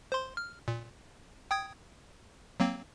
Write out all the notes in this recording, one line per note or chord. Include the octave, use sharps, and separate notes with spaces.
C5 C6
F6
A#2
G5 D#6 G#6
F#3 A#3 C4